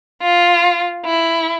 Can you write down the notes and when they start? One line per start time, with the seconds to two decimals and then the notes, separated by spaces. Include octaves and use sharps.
0.22 F4
1.06 E4